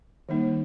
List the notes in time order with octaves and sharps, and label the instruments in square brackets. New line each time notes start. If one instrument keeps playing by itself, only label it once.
[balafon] D#3 G3 A#3 D#4